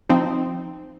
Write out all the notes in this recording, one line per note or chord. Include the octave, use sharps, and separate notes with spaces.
F3 C4 D#4